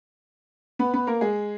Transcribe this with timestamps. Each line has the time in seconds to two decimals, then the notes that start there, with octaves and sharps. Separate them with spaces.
0.79 B3 B4
0.93 B3 B4
1.07 A#3 A#4
1.21 G#3 G#4